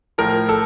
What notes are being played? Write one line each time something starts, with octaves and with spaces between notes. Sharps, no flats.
A2 F3 A#4
A4